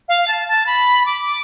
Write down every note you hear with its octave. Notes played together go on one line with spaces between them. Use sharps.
F5
A5
A5
B5
D6